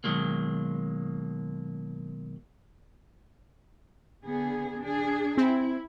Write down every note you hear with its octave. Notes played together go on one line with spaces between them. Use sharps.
B2 D#3 F#3 G#3 A#3
D3 B3 G#4
D4 G#4
C4 E4